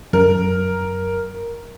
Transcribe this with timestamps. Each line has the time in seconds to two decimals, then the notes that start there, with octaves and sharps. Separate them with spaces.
0.13 F#2 A#4